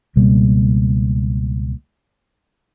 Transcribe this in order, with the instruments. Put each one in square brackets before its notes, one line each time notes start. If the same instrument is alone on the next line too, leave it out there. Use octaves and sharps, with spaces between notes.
[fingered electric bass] C#2 B2 G3 A#3